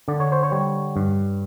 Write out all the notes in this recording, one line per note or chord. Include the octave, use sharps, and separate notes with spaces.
D3 D5
C#5
C5
C#5
G3
G2